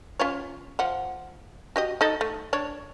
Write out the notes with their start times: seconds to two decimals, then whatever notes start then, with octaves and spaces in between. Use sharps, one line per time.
0.19 C#4 F4 C#5
0.79 F3 F#5
1.76 F#4 G4 D#5
2.01 D#4 A4 D#5
2.21 A3
2.53 D4 C#5